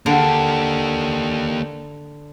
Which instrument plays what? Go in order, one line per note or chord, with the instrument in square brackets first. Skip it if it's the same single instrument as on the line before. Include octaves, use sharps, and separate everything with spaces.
[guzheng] D3 [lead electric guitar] A#3 G4